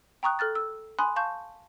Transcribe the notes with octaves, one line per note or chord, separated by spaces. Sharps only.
G5 A#5 C#6 D#6 F#6
A4 F6 F#6 A6
E6
G#5 B5 C6 D#6 F#6
F5 A5 C#6 G6